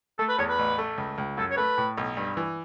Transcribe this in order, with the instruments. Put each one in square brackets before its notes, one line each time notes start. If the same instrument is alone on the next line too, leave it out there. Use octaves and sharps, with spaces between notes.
[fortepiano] A3 [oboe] A4
[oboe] B4
[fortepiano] E2 [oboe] C#5
[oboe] B4
[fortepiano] A1
A3
C#2
C#2
[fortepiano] F#2 [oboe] A4
[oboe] C#5
[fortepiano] A3 [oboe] B4
[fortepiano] A2
B1
G2
E3